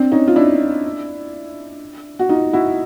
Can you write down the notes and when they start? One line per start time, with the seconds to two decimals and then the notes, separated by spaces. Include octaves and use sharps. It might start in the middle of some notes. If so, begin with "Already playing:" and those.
Already playing: C4 D4
0.12 C#4 D#4
0.28 F4
0.36 D4 E4
2.19 F#4
2.29 D#4 F4
2.53 E4 F#4